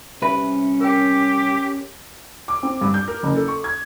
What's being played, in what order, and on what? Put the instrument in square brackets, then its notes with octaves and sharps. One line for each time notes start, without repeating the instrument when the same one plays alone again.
[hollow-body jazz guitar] C2 B4 [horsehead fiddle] C#4 [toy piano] G4 E5 G#5
[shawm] G4 [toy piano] A#4 G5
[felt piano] D6
C4
G2
G6
A#4
F#1
A4
C#6
G#6